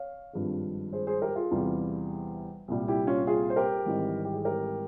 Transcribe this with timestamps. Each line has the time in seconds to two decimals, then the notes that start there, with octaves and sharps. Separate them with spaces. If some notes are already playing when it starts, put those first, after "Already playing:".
Already playing: C#5 F5
0.33 G#1 G2 F3 G#3
0.93 G#4 C5
1.07 G#4 C5
1.22 G4 A#4
1.36 F4 G#4
1.51 E2 C3 E3 G3
2.68 C2 A#2 G3
2.88 E4 G4
3.07 C#4 F4
3.27 F4 G#4
3.50 C5
3.56 G4 A#4
3.86 G#1 G#2 E3 G3
4.25 G4
4.34 G#4
4.44 G4 A#4